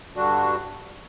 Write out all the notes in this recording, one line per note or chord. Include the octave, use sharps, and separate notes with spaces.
G2 D3 G3 D4 F#4